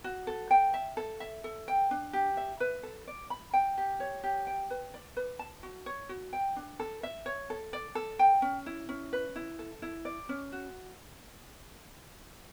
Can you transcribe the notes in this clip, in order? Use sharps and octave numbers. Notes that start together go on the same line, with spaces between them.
F#4
A4
G5
E5
A4
E5
A4
G5
D4
G4
E5
B4
A4
D5
B5
G5
G4
C#5
G4
G5
B4
D5
B4
A5
F#4
C#5
F#4
G5
D4
A4
E5
C#5
A4
D5
A4
G5
C#4
E4
C#4
B4
E4
A4
E4
D5
C#4
F#4